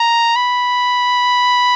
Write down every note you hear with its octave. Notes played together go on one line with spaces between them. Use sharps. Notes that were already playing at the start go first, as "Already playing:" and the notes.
Already playing: A#5
B5